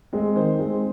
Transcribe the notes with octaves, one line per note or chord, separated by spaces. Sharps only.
G#3 C4
D#3 C5
G#3 C4